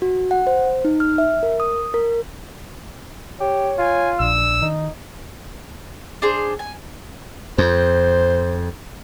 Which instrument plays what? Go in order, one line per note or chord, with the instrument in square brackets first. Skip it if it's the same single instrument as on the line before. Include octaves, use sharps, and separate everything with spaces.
[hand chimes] F#4
F#5
C5
D#4
F6
E5
A#4
D#6
A#4
[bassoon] G4 [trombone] C#5
[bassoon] F4 [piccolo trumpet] G#5
[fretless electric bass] A#1 [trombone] D4 [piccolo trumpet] E6
[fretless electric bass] D#3 [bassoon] D#4
[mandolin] D4 G#4 C5
G#5
[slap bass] F2 [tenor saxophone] C5